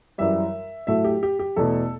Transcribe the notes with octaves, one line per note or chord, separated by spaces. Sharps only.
F#2 E3 G3 E5
A2 F#3 A3 E5
G4
G4
G4
E2 B2 A3 A4